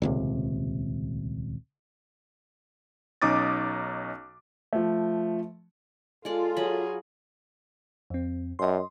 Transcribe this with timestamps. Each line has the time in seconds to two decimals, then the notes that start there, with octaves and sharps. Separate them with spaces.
0.02 D#1 C#2 C3
3.22 B1 C#4 D#4 D6 D#6 A6
4.73 F3 A3
6.25 G#3 F4 A4 D5
6.57 F#3 G#4 B5
8.10 F2 C4
8.59 F#2 D#5 C6